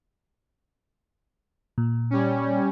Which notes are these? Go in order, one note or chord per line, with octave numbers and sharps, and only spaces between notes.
A#2
G3 C#4